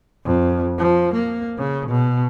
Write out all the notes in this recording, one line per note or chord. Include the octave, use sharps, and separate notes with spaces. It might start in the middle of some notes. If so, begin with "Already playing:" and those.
F2
F3
A#3
C#3
B2